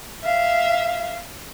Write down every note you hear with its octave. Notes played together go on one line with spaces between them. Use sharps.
E5 F5